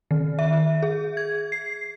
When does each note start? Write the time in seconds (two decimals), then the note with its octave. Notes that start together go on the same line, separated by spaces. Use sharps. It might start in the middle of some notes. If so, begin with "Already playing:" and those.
0.11 D#3
0.39 E5
0.82 G#4
1.17 G#6
1.52 C7